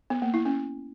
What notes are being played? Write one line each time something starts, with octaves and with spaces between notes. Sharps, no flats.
B3
A#3
E4
C#4